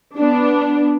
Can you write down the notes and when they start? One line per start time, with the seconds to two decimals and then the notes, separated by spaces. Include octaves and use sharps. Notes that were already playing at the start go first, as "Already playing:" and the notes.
0.17 B3 D4